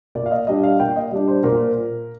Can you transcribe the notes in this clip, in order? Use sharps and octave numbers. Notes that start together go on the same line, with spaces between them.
A#2 D5
F5
D#5
G3 D4 D#5
F5
A#2 G5
D#5
G3 D4
C5
A#2 A#4